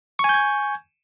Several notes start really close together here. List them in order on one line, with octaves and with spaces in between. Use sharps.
C#6 G#5 G6 G#6